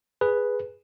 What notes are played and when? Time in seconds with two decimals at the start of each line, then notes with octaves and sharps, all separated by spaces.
0.21 G#4 B4